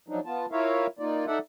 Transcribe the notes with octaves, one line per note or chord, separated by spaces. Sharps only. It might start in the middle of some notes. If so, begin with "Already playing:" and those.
F3 F#3 D4 D#4
B3 F4 A5
E4 F4 A#4 C#5 E5 F5
A#3 D#4 F4 D5
D#4 A4 D5 E5 F#5